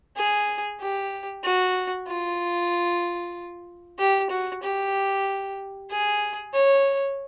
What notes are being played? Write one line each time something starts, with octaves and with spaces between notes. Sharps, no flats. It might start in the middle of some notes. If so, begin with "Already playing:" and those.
G#4
G4
F#4
F4
G4
F#4
G4
G#4
C#5